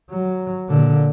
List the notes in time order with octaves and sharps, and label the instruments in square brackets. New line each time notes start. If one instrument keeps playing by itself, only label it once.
[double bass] F#3
A#2 D3